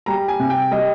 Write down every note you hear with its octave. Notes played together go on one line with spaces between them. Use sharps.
G3 A#5
G#5
C3
G5
G3 D#5